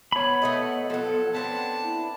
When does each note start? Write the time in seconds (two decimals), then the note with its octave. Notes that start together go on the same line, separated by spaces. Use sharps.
0.12 B3 C#5 B5
0.42 A3 A4 D#5
0.90 F3 F#3 A4
1.34 B3 C4 D4 A5
1.83 E4